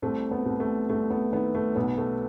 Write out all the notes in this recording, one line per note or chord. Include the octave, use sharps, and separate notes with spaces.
C2 A3 C4
B3
C2
A3
C2 A3
B3
D#3 B3
A3
B1 B3
A3